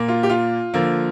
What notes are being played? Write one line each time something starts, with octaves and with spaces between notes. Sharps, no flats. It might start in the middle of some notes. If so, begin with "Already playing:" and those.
Already playing: A#2 A#3
F4
G4
F4
D3 F3 A#3